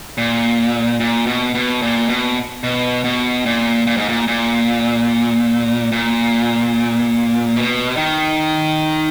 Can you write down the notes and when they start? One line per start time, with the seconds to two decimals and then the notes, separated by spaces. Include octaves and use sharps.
0.18 A#2
1.00 A#2
1.27 B2
1.55 B2
1.82 A#2
2.09 B2
2.63 B2
3.04 B2
3.46 A#2
3.87 A#2
3.97 G#2
4.09 A#2
4.28 A#2
5.92 A#2
7.56 B2
7.97 D#3